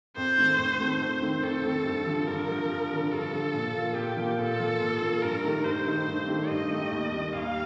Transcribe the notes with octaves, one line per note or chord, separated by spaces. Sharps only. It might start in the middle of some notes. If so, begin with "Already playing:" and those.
F2 C5
D#3 A3 C4
F2
D#3 A3 C4
F2 C5
D#3 A3 C4
F2 A4
D#3 A3 C4
G2
D3 F3
G2 A#4
D3 F3
G2
D3 F3
G2 A4
D3 F3
A#2
F3 A#3 F4
A#2 G4
F3 A#3 F4
A#2 A4
F3 A#3 F4
A#2
F3 A#3 F4
G2 A#4
D#3 A3 D#4 G4
G2 C5
D#3 A3 D#4 G4
G2
D#3 A3 D#4 G4
G2 D#5
D#3 A3 D#4 G4
D#2
D#3 G3
D#2 F5